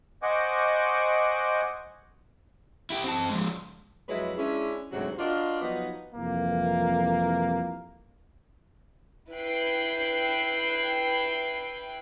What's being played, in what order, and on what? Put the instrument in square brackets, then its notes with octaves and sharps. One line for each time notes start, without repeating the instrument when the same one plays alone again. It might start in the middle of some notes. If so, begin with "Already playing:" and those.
[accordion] C5 D#5 F#5 G#5 C#6 D6
[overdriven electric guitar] E4 G4
C4 A5
F3 G#3
[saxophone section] F2 F#3 G#3 E4 B4 C#5
G#3 C#4 D4 E4
D2 G#2 C3 F#3 F#4
D4 F4 F#4 A#4 D5 D#5
F3 F#3 B3 D#4
[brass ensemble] C2 F2 E3 A#3
[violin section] E4 B4 G5 F#6 C7